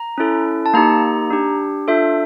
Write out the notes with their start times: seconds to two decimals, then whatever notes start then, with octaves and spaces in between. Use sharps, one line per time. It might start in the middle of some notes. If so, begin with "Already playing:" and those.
Already playing: A#5
0.18 C#4 E4 A4
0.66 A5
0.74 A#3 D#4 G4 A#5
1.30 D4 G4
1.88 D4 F4 A4 E5